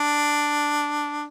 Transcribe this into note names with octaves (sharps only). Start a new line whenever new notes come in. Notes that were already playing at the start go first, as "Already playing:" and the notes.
Already playing: D4